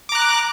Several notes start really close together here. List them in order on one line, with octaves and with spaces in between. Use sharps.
D6 A#5 F#6